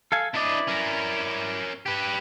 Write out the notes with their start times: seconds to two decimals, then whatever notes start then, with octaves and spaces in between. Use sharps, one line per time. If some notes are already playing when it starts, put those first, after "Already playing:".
0.12 A4 F5 G#5
0.34 D4 E4 B4 D5 D#5
0.67 C#4 A#4
1.86 G4 B4